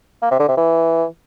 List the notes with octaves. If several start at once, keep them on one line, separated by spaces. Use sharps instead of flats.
A#3
C3
D3
C3
E3